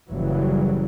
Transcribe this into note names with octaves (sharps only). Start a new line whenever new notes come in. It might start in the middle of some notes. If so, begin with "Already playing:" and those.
F#1 C#3 E3 F#3 G3